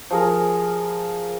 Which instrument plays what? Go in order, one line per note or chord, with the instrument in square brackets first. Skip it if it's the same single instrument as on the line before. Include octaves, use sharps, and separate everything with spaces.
[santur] F3 G#4 A#4